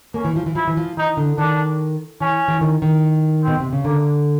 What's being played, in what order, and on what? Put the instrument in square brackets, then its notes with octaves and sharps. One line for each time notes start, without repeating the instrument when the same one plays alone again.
[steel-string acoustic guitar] A#3 [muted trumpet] C#4
[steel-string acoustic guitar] E3
F3
E3
[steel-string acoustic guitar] F3 [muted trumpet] E4
[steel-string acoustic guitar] E3
F3
[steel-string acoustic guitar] E3 [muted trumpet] D#4
[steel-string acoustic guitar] D3
[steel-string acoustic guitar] D#3 [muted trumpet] D4
[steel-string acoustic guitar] E3 [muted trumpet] C#4
[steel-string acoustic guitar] E3
D#3
D#3
[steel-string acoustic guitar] B2 [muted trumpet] C4
[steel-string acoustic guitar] C3
C#3
[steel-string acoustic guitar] D3 [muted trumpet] A#3